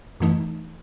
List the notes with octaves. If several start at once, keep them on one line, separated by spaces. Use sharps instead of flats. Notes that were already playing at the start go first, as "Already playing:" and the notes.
F#2 E3 A3 D#4